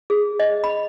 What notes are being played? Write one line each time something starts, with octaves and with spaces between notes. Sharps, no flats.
G#4
D#5
B5